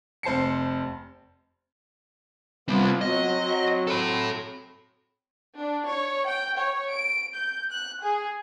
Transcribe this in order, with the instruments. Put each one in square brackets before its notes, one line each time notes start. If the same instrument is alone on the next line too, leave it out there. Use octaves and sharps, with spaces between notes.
[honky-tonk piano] F1 C5 A5 C7 C#7
[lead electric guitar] G3 C4 [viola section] B3 D4 F4
[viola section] F#3 C4 [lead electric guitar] D#5
[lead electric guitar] A4 B5
[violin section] D4
C#5
G5
C#5
D7
G6
F#6
G#4